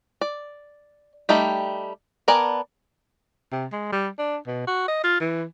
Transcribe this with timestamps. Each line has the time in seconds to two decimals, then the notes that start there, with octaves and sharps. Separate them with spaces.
0.21 D5
1.29 G3 A3 D#4 G4
2.28 B3 A#4 D5 G#5 A5
3.52 C3
3.72 G#3
3.92 G3
4.19 D4
4.47 B2
4.67 F#4
4.88 D#5
5.04 F4
5.21 E3